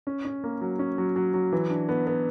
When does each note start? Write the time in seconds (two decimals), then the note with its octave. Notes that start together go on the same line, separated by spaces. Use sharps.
0.07 C#4
0.25 C#4
0.44 A#3
0.61 F#3
0.79 C#4
0.98 F#3
1.16 F#3
1.34 F#3
1.52 E3
1.70 D4
1.89 B3
2.07 B3